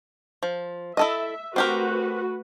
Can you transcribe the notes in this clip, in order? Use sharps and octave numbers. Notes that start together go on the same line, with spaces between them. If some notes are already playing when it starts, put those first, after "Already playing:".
F3
E4 A4 D#5 E5
A3 C4 F#4 G4 A#4 B4